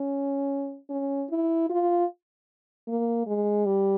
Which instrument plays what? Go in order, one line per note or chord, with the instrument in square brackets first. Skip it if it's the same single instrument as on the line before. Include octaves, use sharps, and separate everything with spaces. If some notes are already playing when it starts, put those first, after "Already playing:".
Already playing: [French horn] C#4
C#4
E4
F4
A#3
G#3
G3